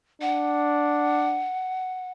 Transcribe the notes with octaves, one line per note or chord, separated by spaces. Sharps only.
D4 F#5